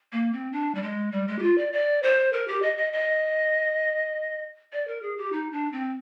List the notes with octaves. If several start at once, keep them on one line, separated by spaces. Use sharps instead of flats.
A#3
C4
D4
G3
G#3
G3
G#3
G4
F4
D5
D5
C5
A#4
G4
D#5
D#5
D#5
D5
A#4
G#4
G4
D#4
D4
C4